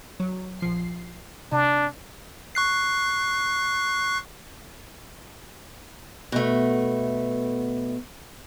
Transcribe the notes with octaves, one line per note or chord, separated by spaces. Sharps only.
F#3
A#1 F3 C7
C3 D4
C#6 F#6 C7
B2 A3